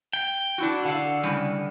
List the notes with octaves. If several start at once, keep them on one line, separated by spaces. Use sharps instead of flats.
G5
D4 E4 F#4
D3 A4 F5 F#5
A2 C#3 G3